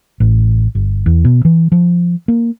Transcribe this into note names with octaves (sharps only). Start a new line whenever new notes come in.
A1
G1
E2
B2
E3
F3
A#3